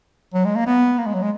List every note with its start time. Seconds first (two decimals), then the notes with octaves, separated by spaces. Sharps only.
0.34 F#3
0.45 G#3
0.56 A#3
0.66 B3
0.98 A#3
1.06 G#3
1.14 F#3
1.22 G#3